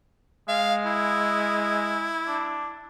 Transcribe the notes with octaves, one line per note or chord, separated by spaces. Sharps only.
G#3 F5
E4
D4